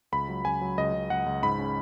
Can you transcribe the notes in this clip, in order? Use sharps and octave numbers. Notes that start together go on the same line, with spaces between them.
C#2 B5
F#3
C#2 G#5
F#3
C#2 D#5
C#2
C#2 F#5
C#2
G#2 B5
C#4